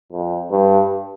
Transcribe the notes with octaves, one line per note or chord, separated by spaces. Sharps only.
F2
G2